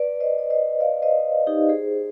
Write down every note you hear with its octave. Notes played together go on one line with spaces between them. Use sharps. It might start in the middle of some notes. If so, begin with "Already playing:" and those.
Already playing: B4 D5
C5 D#5
D5
C5 D#5
D5 F5
C5 D#5
D#4 G4
G#4 C5